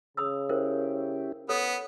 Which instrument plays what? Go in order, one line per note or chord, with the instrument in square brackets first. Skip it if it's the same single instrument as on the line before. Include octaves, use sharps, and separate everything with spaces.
[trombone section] C#3 [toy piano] B5 D#6 E6
[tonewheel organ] C#4 E4 G4 [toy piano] A#4 C5
[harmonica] B3 [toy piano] A4 C#5 D#6